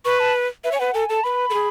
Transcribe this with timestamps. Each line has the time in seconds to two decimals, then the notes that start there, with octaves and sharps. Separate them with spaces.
0.05 B4 C#6
0.20 A5
0.64 B4 E5
0.72 C#5
0.75 G#5
0.80 B4 F#5
0.94 A4 G#5
1.09 A4 A5
1.24 B4 B5
1.50 A4
1.54 G#4